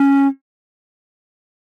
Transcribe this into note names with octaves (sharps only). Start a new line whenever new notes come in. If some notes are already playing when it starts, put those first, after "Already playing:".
Already playing: C#4